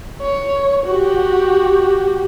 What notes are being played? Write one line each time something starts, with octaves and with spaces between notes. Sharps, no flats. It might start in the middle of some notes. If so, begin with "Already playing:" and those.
C#5
F#4 G4